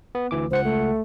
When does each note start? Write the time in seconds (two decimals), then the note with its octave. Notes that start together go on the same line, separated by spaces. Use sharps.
0.15 B3
0.31 D2 E3 D6
0.51 C#2 C5 F#5 C#7
0.64 A3